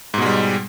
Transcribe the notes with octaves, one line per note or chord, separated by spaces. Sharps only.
G#2 B2 G3 G#3